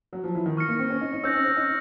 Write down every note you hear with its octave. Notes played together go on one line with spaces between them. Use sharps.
F#3
F3
E3
D#3
C#6 F6 A#6 C#7
A#3
C4
C#4
D#4
D#4
C#4 E6 G6 A#6
C4
C#4
D#4